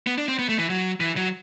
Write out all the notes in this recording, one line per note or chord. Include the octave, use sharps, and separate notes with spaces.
B3
D4
C4
B3
A3
E3
F#3
E3
F#3